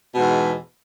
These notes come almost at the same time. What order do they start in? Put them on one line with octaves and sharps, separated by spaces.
B2 G#2 E2